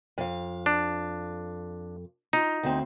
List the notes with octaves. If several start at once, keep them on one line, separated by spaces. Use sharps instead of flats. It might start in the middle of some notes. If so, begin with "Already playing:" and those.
F2 F5
D4
D#4 F4
D2 C4